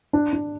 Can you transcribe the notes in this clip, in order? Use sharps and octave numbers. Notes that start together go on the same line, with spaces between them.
D4
D4